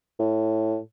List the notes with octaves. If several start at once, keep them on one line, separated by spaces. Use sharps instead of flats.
A2